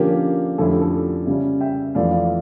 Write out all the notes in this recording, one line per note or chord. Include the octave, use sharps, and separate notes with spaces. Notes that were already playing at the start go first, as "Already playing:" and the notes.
Already playing: D3 F3 A#3 C#4 G4 A#4
F2 D3 A3 C#4 E4 A4
G4
A4
C#3 G3 C#4
E5 G5
F2 E3 A3 E4 D5 F5
D5 F5